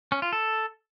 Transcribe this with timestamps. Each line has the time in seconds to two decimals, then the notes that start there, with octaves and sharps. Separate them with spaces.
0.12 C#4
0.22 F4
0.33 A4